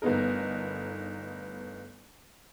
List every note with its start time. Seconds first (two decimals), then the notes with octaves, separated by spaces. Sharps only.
0.02 G1 A3 B3 D#4 A#4